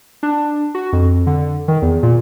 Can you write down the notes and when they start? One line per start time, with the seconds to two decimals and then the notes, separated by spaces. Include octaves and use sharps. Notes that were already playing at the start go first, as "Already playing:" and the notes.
0.23 D4
0.75 F#4
0.93 F2
1.27 D3
1.68 D#3
1.82 E2
2.03 A#2